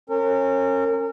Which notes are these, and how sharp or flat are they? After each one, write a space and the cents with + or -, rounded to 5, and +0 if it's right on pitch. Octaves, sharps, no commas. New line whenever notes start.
C#4 -30 A#4 -35